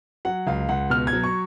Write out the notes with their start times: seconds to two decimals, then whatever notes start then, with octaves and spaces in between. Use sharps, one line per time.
0.25 F#3 F#5
0.47 C#2 F5
0.69 C#2 F#5
0.90 B2 F6
1.07 G#6
1.13 F#3
1.23 C#6